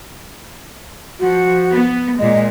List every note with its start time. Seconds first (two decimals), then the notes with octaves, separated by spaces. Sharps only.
1.20 F3 F#4
1.72 B3
2.19 A#2 G#3 D#5